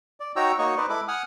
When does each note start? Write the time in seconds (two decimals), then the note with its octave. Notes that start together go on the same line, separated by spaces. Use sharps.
0.20 D5
0.36 D#4 F#4 C#5 G5 A#5 E6
0.59 A#3 D#4 F#4 C#5 D#5 C#6
0.77 D#4 B4 C5 D5 D#5
0.89 G#3 E4 A4 B4 B5 D6
1.08 F#5 G#5 D#6 F6